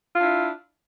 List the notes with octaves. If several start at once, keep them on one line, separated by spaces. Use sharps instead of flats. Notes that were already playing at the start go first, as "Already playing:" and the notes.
D4 E4 F4